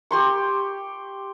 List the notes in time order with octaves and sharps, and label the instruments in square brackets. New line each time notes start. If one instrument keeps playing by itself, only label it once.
[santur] G4 C6 C#6